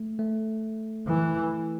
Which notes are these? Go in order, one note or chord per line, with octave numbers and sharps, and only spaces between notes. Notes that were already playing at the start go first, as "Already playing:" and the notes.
Already playing: A3
A3
E3